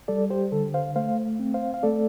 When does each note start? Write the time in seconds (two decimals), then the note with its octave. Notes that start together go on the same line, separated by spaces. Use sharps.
0.08 G3 A4 D5
0.30 G4 C5
0.52 D3 A4
0.74 C5 F5
0.96 A3 C5 F5
1.40 C4
1.54 C5 F5
1.74 F5
1.83 A3 A4 D5